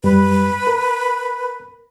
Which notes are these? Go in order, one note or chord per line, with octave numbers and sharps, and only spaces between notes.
F#2 G3 B4
A#4